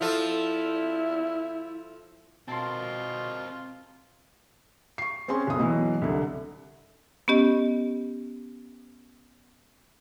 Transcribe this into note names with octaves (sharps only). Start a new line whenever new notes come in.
F3 E4 F4 A4
B2 C4 F4 A#4 A5 C6
C#6 C7
C4 C#4 G#4 C6
F#1 B1 D#6
B2 E3 F#3
C2 D3
B3 C#4 G4 D#5